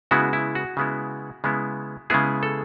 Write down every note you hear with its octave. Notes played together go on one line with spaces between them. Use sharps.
C#3 G#3 B3 E4 F#4
E4
F#4
C#3 G#3 B3 E4
C#3 G#3 B3 E4
C#3 G#3 B3 E4 G#4
A4